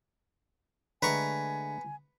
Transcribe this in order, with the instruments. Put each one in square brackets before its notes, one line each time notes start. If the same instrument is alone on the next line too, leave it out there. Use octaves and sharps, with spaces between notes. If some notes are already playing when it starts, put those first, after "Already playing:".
[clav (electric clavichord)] D3 G#3 A3 [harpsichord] B4 A#5 C#6 [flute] G#5